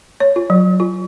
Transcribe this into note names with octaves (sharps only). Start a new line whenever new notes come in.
C#5
F4
F#3
F4